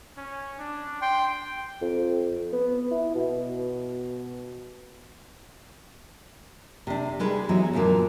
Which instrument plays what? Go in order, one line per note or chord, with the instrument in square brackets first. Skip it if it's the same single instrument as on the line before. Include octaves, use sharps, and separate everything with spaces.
[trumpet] C#4
D4
[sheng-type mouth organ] G5 [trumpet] C6
[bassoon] F2
B3
E4
B2
[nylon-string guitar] C3 D4
G3 G#3 D#4 B4
E3 F#3 B3 D#4
F#2 A#2 D3 F3 A#3